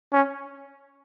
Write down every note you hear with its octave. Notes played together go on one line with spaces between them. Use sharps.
C#4